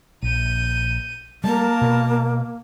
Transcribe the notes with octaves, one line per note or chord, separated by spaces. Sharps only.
A#1 G6 D#7
G3 A3 A#3 A#4 A5
B2